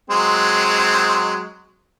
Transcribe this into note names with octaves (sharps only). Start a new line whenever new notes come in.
F#3 G#3 C4